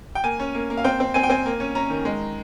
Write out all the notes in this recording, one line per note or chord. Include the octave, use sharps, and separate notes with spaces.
G5
A#3 G#5
C#4
A#3
A#3
F5
C4 G5
C4
C4 G#5
G5
C4 G#5
A#3
C#4
C#4 A#5
D#3
G#3